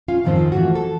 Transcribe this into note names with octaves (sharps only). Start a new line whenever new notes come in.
C#4 F4 F5
F2 G#2 D#3 F3 C4 C5
E3 F3 A3 F#4
A4